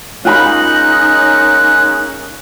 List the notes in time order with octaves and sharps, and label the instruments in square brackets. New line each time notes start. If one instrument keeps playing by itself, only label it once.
[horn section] G#3 A#3 C#4 [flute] D#4 [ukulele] F4 G5 B5 [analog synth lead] F#6